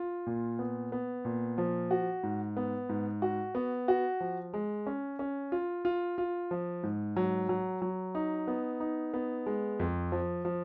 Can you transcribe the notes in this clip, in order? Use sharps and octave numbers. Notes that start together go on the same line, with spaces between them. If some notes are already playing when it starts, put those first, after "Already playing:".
Already playing: F4
A#2
B3
B3
A#2
F3
F#4
G#2
B3
G#2
F#4
B3
F#4
F3
G#3
C#4
C#4
F4
F4
F4
F3
G#2
F#3
F#3
F#3
D#4
B3
D#4
B3
G#3
F2
F3
F3